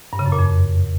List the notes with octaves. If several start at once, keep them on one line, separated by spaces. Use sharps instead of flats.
G2
C#3
F#2
A#2
F2